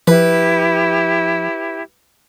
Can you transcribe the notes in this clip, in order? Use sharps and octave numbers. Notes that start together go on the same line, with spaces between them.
F3 E4 G4 B4